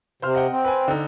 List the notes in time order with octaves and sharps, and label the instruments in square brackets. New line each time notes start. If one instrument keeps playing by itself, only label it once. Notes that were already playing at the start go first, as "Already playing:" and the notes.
[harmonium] C3 [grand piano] C5 C6 F6
[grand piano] D#5 F#5 G5
[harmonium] C4
[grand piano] B4 G#5
D3 D#4